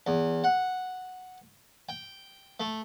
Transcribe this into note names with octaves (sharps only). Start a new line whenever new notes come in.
E2
F#5
G5
A3